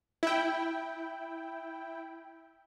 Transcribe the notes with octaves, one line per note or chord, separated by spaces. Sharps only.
E4 G5